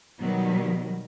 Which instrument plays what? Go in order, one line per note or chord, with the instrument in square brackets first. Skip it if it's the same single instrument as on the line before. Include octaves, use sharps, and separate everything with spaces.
[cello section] B2 D#3 F#3 G3